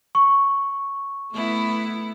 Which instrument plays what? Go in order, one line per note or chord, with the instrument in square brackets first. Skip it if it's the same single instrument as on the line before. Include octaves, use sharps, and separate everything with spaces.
[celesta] C#6
[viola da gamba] A3 B3 E4